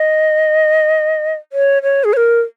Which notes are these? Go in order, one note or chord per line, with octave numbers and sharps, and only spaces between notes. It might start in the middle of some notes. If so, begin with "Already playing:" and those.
Already playing: D#5
C#5
C#5
G#4
C#5
A#4